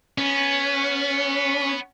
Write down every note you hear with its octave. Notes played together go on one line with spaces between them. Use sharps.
B3 C#4